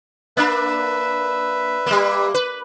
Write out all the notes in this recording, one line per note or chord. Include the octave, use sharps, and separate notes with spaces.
A#3 D4 B4 E5
G3 A#3
B4